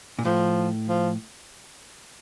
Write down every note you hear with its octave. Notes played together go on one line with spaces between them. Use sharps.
A#2
A2 F3
F3